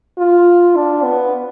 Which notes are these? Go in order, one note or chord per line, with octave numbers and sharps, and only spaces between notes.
F4
D4
B3